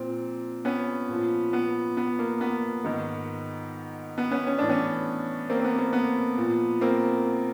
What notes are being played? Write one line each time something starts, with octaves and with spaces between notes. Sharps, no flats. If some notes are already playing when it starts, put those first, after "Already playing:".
Already playing: A#2 F3 C4
B3 C#4
A#2 F3
B3
B3
A#3
B3
G#2 D#3
B3
B3 C#4
C#4
A2 E3 D4
B3 C#4
A#3 C4
C4
B3
A#3
B3
A#2 F3
A#3 C4